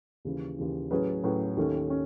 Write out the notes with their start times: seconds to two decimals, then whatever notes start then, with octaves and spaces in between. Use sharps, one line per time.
0.25 D#2 C#3 E3
0.58 D#2 C#3 E3
0.91 A2 F#3 C#4 G#4 B4
1.23 A2 F#3 C#4 G#4 B4
1.57 D#2 D#3 A3 C#4
1.90 C#4